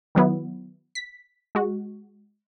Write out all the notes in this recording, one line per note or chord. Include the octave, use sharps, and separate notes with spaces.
D#3 F#3 B3 E4
B6
G#3 F#4